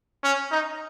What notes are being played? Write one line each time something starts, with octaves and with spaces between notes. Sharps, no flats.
C#4
D#4